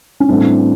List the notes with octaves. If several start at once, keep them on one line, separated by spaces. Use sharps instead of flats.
C#4
A2 E3 G3 C4 D4